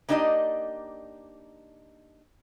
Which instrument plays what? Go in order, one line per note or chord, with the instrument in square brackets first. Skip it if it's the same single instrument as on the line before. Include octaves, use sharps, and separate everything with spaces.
[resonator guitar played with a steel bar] A#3 D4 D#4 G4 D5 D#5